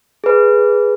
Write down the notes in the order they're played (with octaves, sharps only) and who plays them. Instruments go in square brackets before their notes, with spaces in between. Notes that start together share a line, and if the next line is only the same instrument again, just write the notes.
[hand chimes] G#4 B4